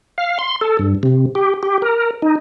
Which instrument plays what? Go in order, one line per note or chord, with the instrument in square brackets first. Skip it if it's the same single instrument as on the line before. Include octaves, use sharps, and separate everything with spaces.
[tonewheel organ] F5
C6
A4
G2
C3
G4
G4
A#4
D#4